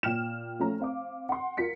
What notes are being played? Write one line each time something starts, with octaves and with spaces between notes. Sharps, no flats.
A#2 G5 F6 E7
F3 A3 C#4 A#5
C4 F5 D6
F#5 C6
F4 A#4 B6 C#7